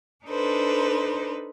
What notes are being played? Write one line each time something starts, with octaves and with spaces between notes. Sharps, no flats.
D4 D#4 A4 B4 C5